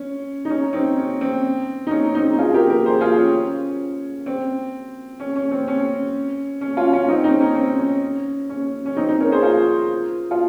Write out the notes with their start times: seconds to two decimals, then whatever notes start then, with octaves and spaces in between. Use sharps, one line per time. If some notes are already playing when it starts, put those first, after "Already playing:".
Already playing: C#4
0.45 D#4
0.50 C#4
0.73 C4 D#4
0.97 C#4
1.21 C4
1.87 D#4
1.91 C#4
2.15 C4 D#4
2.39 F4 G#4
2.54 G4 A#4
2.70 G4 A#4
2.85 G#4 C5
3.01 F4 G#4
3.16 C#4
4.26 C4
5.20 C#4
5.36 C#4
5.51 C4
5.68 C#4
6.61 C#4
6.77 C#4 F4
6.93 C#4 F4
7.08 C4 D#4
7.19 C#4
7.24 C4 D#4
7.40 C#4
7.55 C4
7.78 C#4
8.49 C#4
8.86 C#4
8.97 C4 D#4
9.08 C4 D#4
9.20 A#4 C#5
9.31 G#4 C5
9.43 F4 G#4
10.31 F4